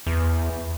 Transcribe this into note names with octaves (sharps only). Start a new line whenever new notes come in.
E2